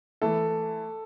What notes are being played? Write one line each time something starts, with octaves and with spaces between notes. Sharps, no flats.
E3 A3 E4 A4